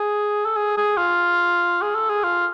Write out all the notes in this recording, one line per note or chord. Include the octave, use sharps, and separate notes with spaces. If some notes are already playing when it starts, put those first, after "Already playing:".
Already playing: G#4
A4
G#4
G#4
F4
G#4
A4
G#4
F4